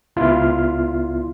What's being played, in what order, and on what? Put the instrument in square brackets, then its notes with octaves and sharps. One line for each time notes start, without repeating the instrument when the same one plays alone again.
[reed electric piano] C#2 B3 E4 F4 C6 F6